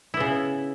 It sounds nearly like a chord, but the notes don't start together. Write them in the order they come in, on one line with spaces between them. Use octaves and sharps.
E4 B3 C#3